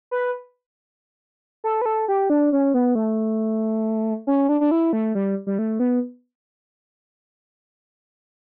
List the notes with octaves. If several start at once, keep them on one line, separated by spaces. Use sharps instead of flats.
B4
A4
B4
A4
G4
D4
C#4
B3
A3
C#4
D4
D4
E4
A3
G3
G3
A3
B3